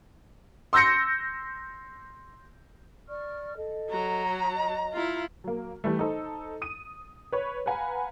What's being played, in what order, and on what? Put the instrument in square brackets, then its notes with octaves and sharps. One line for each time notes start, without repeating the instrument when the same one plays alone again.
[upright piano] C6 E6 G6 A#6 C#7
[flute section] D5 C#6 F6
A4 D#5
[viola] F#3 [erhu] A#5
[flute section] D#5
[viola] E4 F4
[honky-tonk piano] F#3 A#3
E3 G3 A3
D#4 A4 C5
D#6 D#7
B4 C#5
B4 F5 F#5 G#5 A#5 B5